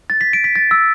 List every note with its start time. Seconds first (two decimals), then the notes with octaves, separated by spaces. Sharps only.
0.10 A6
0.21 B6
0.33 D7
0.44 B6
0.56 A6
0.71 E6